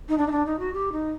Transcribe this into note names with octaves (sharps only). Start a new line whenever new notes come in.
D#4
D4
D#4
D4
D#4
F#4
G4
D#4